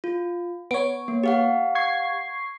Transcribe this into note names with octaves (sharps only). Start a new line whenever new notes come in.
F4
B3 C#5 D7
A#3
G4 F5 F#5
C#6 G#6 C7